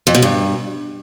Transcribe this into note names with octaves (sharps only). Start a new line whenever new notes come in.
F2
B2
G2